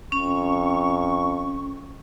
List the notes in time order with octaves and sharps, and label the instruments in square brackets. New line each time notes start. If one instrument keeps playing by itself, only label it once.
[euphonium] F2 [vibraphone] C#4 [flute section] C#6